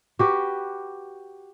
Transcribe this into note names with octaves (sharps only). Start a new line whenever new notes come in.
F#4 G4 B4